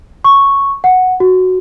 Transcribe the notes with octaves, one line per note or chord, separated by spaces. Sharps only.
C#6
F#5
F#4